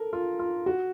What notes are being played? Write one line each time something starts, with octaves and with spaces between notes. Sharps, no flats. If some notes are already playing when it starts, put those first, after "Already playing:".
Already playing: A4 A#4
F4
F4
F#4